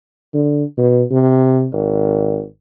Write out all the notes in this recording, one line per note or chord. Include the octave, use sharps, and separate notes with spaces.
D3
B2
C3
G#1